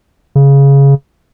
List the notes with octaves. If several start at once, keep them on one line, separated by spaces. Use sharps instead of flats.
C#3